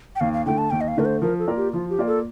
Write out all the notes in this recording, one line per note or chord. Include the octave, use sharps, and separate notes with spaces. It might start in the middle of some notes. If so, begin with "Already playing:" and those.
G5
D#2 F5
F5
D3 A3 G5
A5
D#2 G5
D#5
F5
D3 A3 A#4
C5
F3 A#4
A4
A#3 F4 A#4 D5
G4
F3 F4
G4
A#3 F4 A#4 D5
A4